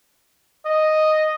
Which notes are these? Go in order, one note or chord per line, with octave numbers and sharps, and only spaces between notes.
D#5